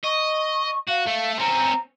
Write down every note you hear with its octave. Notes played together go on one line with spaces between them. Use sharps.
D#5 C#6
F#4 F5
A3
C4 C#4 A#5